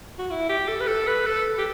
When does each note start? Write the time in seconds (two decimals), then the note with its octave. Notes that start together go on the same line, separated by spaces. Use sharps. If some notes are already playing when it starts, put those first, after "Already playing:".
0.19 F#4
0.31 E4
0.49 G4
0.68 A4
0.80 B4
0.87 A4
1.07 B4
1.26 A4
1.59 G4